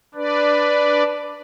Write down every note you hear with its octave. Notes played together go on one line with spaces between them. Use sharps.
D4 B4 D5